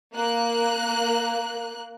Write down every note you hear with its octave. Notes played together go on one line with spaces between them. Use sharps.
A#3 F#6